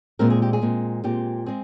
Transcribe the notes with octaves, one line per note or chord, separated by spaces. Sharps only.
A#2 G#3 C4 A#4
G#4
G4
G#4
A#2 G#3 C4
A#2 G#3 C4 G4
G#3 C4 G#4